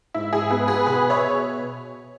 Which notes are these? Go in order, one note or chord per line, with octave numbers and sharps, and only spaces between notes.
G#2 E4
E4 G#4
B3 G#4 B4
G#4 B4
B2 G#4 B4
C#5 E5